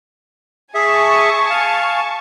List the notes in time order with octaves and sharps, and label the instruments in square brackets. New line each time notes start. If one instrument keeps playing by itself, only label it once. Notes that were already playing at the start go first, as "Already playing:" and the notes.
[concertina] G#4 E5 [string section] G#5 A5 C#6
[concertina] F5